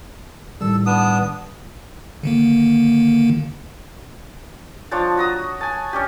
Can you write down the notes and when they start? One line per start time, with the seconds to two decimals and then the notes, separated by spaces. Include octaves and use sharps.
0.61 A2 D#3 G3 A4 E6
0.86 B3 D4 D#6
2.23 D3 D#3 A#3
4.91 F3 D4 C#5 A5
5.17 F#4 A#5 D#6
5.61 G#5 A5
5.93 C#4 D4 G4